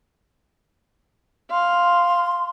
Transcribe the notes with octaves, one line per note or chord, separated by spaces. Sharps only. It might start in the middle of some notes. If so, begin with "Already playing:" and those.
F5 C6